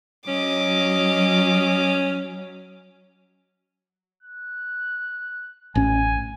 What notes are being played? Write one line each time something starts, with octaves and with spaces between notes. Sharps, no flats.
F#3 C#4 D#5 D6
F#6
A1 C#4 G#5